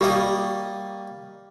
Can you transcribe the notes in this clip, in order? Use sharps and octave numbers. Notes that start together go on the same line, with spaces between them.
G3 A#3 G4 D#5